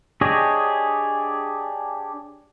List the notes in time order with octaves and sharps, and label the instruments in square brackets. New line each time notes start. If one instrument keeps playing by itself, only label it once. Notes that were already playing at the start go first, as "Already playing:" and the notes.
[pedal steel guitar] D4 G4 G#4 C#5 D#5